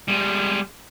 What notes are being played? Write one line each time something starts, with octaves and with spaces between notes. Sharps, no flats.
G3 G#3